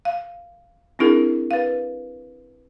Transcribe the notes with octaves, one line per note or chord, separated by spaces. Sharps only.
F5
C4 D4 E4 G#4 A#4
B4 F5